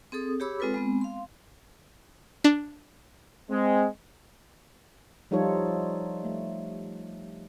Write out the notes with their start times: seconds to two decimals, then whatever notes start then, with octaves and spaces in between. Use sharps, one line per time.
0.12 C4 G#4 A4 D#6
0.40 G4 G#4 C#5 B5 D6 E6
0.60 G#3 C4 F4 A4 B4
0.74 G#3 B3 C4
1.01 F5 C6
2.44 D4
3.49 G#3 C4
5.31 F3 G3 D#4 F4 A4 C#5
6.24 A3